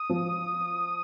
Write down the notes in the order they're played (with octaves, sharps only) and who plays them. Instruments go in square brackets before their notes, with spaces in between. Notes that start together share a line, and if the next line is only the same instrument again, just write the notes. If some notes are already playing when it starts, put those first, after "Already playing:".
Already playing: [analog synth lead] D#6
[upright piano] F3